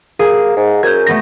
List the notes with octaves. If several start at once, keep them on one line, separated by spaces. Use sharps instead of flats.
A#3 G#4
G#2
F#2 G6 G#6
A3 B3 A#6